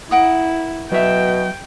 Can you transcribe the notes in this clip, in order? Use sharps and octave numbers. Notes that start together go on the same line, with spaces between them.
E4 A#4 F#5 D#6
B2 F#3 E5 G5